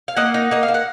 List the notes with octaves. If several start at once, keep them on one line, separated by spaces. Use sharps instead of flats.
F5
A#3 D#5 F#5
D#4
A#3 D#5
F5
A#3
F#5